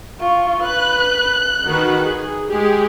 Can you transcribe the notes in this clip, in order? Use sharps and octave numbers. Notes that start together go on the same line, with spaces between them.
F4 C#6
B4 F#6
D#3 F#4 B4
G#4
G#3 G4 G#4